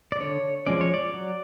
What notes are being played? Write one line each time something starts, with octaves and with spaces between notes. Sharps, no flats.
D5
D3 C#5
F3 G#3 C#4 D5
C#5
D5
F#3